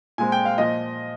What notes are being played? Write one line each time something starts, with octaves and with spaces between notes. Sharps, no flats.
A#2 G#3 C4 G#5
G5
F5
A#2 F3 D#5